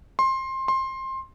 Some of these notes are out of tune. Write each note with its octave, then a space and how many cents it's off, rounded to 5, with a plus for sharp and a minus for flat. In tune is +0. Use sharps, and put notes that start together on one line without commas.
C6 +20
C6 +20